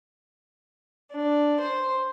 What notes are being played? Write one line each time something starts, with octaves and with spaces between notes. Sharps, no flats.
D4
C5